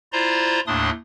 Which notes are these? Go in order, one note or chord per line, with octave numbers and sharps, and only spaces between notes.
E4 F4 C5 D5 A#5 C6
D#2 A2 A3 D4 C6 D#6